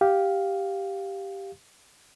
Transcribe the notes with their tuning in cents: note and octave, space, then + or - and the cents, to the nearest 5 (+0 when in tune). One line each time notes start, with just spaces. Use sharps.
G4 +0 F5 +5